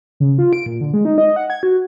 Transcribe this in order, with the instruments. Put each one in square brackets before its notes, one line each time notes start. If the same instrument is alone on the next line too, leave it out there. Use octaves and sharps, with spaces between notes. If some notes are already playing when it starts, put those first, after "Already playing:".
[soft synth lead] C#3
F4
D7
A#2
D3
G#3
D#4
D#5
F#5
G#6
F#4